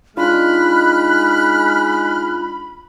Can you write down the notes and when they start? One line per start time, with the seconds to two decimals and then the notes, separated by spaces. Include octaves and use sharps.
0.17 G#3 D4 D#4 F4 B5 F6 F#6